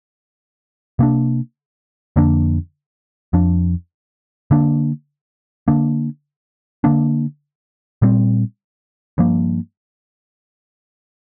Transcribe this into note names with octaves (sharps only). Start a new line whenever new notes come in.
C3 A#3 D4
F2 D3 A#3 D4
F2 F3 D4
D3 A#3 D4
D3 A#3 D4
D3 A#3 D4
A#2 G3 C4
G2 F3 A#3